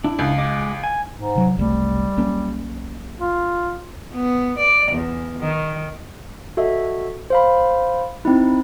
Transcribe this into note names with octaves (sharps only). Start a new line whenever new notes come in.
D4 E4
C#2
G#3 D#5 D6
G#5
G#2
C3 F#3
F#1 C2 G3 A3
B1 A#3 C#4
F4
B3
D5
E2
D#3
F#4 A4 D#5 E5
C5 F5 B5
C4 D#4 E4